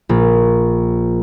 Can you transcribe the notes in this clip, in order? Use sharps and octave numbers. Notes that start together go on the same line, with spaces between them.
A#1